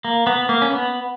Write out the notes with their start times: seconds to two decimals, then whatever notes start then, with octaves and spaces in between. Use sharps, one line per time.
0.05 A#3
0.27 B3
0.49 A#3
0.62 C#4
0.70 B3